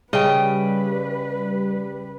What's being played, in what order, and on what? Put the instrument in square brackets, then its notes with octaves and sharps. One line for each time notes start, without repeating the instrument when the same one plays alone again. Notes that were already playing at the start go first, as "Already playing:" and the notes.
[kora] C#3 [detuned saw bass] G3 [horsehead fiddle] B4 [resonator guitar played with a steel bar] D#5 G5